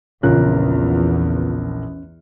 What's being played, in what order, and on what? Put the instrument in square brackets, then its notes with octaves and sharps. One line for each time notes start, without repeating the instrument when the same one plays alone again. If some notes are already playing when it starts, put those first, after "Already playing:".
[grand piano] A#1 A#4 F#6 [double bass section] E2 [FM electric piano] C#3 F4 [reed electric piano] C#4